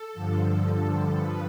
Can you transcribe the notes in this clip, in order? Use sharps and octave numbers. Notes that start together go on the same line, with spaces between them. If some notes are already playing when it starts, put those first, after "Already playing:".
Already playing: A4
G2 D3 F3
G2 F3 B4